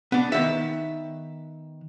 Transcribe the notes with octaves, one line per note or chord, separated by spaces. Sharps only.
B3 D4
D#3 B3 E5